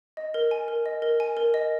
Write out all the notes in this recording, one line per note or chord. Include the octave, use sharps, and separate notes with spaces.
D#5
A#4
G#5
A#4
D#5
A#4
G#5
A#4
D#5